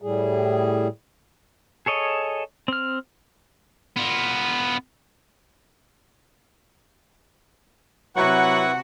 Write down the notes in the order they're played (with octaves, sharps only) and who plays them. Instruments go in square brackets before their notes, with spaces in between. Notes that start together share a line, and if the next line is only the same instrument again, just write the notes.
[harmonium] A2 G3 G#4
[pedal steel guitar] G#4 A4 C#5 D#5
C4 F6
[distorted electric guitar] B3 F4
[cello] C3 F#4 [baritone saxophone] F#3 [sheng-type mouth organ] E4 B4 C#6 [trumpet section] F#5